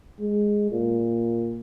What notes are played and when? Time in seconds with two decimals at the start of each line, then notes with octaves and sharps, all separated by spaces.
0.20 G#3
0.71 A#2